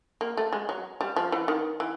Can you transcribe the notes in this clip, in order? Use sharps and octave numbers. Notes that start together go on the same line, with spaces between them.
A#3
A3
G#3
F#3
G3
F3
E3
D#3
E3